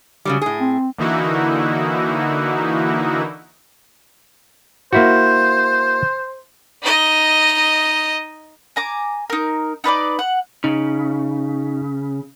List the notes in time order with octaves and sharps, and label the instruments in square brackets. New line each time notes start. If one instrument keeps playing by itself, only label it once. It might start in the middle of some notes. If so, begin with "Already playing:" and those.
[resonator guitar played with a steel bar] C#3 F#3 G3
A2 G#4
[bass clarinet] C4
[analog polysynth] D3 E3 A#3 D#4 E4 F#4
[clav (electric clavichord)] A#3 E4 F#4 [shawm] C5
[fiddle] D#4 D#5
[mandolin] G#5 A#5 D6
D#4 A#4
D#4 B4 D5 D6
F#5
[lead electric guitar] C#3 [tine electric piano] D#4